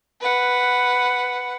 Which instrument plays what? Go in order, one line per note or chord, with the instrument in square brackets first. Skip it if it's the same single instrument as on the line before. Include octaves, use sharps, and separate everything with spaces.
[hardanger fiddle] B4 F#5